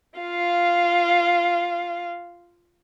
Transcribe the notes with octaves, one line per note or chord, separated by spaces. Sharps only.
F4 F5